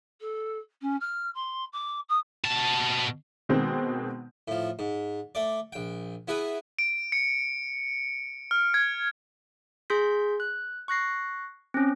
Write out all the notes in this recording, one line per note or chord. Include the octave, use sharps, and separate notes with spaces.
A4
C#4
F6
C6
D6
D#6
B2 A5
B2 D#3 G#3 C4
A2 F3
G#2
A3 D5
A#1 G5
B3 E4 G#4 B4
D7
C#7
F6
G#6
G#4 C6 G6 B6
F#6
C#6 F#6 A#6 C7
C4 C#4